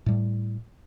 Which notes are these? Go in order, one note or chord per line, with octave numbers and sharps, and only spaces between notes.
A2 G3